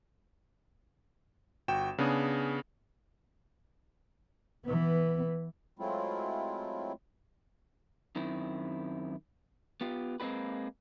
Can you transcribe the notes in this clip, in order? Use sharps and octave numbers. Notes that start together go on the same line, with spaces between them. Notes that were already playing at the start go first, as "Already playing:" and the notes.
G1 F#4 G5 E7
C#3 B3 D4 G#4
E3 B3
F#3 G#3 A3 C4 E4 F4
F#2 D#3 C4 E4
B3 F4 G4
G#3 A#3 C4 D4 G4 B4